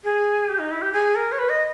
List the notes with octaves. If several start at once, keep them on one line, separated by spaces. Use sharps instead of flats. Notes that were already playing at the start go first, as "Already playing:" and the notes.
G#4
G4
D#4
E4
G4
G#4
A#4
C#5
B4
D#5